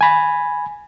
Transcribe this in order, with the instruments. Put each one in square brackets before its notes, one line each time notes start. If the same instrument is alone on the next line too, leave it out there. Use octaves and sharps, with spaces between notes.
[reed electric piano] G#5 B5